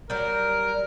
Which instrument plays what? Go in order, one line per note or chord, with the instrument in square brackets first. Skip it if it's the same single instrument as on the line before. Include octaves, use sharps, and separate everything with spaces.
[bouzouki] F#3 G3 [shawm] A#4